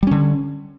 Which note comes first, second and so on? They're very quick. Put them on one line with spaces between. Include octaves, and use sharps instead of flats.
G3 C#4 D3